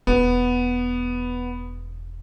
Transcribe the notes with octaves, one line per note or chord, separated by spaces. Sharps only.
E1 B3